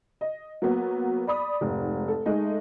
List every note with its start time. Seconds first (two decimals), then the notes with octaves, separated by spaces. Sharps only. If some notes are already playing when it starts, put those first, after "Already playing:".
0.21 D#5
0.62 F#3 A#3 B3
1.27 D5 B5 D#6
1.61 F1 G#2
2.08 A4
2.26 G#3 A3 D#4